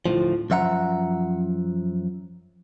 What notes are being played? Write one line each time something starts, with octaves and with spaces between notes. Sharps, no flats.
D2 A2 F3
F#2 F3 E5 F#5 A#5